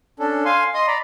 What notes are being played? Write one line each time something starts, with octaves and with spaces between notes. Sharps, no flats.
C#4 D4 A4
F5 G#5 C6
D#5 C6 D#6
D5 A#5 B5